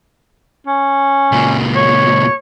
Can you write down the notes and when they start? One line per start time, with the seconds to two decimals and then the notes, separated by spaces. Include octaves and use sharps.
0.67 C#4
1.32 C#2 A#2
1.75 C#5